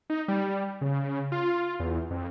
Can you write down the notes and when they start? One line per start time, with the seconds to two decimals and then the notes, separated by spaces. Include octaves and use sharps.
0.10 D#4
0.28 G3
0.81 C#3
1.32 F4
1.80 E2
2.11 F2